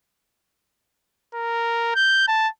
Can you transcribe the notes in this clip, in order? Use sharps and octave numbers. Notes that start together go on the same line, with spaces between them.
A#4
G6
A5